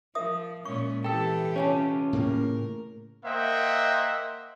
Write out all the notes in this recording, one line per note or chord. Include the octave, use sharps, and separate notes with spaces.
F3 A#4 E5 D#6
A#2 G#3 C#4 C#6
C3 E3 G4 A4 G5 E6
C#4 F4 C#5 G#5 A5
A2 C#3 A#3 A#4
A#3 C5 D#5 E5 F#5 G5